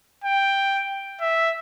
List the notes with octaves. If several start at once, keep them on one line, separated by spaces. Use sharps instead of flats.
G5
E5